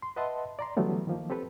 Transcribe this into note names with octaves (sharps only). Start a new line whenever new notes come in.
C6
B4 D#5 E5 F#5 A5 C6
D5 A#5 C6
D3 E3 F#3 G3 A3 B3
D#3 F3 A#3
C4 G4 A4 B4